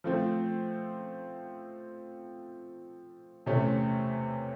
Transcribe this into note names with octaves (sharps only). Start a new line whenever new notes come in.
F3 A3 C4
E2 C3 E3 A3 C#4